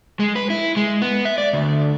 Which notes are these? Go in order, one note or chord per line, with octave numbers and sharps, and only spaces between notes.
G#3
B4
E4
G#3
B3
E5
D5
D2